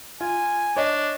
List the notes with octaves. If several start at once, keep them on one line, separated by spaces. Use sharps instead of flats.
F4 G#5
D4 C#5 D#5